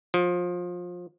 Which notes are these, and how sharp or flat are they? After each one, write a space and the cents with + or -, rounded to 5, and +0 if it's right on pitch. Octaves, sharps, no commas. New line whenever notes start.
F3 +25